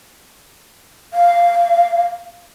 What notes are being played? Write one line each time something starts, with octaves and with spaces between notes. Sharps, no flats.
F5